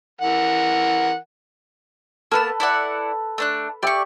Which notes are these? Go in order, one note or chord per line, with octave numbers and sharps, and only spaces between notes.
E3 A#4 F#5
A#3 B3 A4 B4 A5
E4 D5 F#5
A3 D4 F#6
G4 D5 E5 C#6 D6